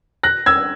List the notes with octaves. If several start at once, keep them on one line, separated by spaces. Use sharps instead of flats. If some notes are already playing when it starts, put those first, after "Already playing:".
F#6 A#6
E6 G#6